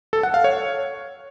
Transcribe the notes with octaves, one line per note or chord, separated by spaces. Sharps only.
A4
F#5
F5
C#5